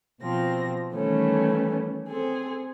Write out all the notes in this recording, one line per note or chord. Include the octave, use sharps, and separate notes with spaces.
B2 F3 C4 A#6
D#3 E3 G3 A3 B3 C#4
C4 G#4 A4